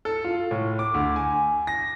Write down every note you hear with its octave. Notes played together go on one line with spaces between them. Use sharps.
A4
F4
A2
D6
D2
G#5
A#6